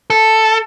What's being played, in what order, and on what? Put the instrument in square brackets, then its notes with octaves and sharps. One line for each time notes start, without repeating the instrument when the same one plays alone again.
[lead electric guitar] A4